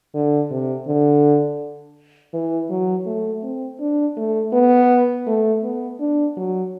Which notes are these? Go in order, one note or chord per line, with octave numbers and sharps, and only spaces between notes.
D3
C3
D3
E3
F#3
A3
C4
D4
A3
B3
A3
B3
D4
F#3